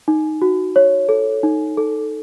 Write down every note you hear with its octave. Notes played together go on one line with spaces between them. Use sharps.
D#4
F#4
C#5
A4
D#4
A4